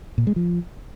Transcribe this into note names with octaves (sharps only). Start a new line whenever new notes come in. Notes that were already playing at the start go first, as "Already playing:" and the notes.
A#2
G#3
F3